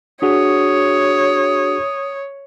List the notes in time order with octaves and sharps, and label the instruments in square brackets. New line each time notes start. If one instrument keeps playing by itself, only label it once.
[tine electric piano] D4 F#4 G#4 [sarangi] C#5 [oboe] D#6